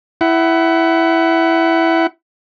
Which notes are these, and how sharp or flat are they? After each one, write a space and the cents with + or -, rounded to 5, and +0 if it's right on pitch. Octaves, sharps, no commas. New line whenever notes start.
E4 +0 F#5 +25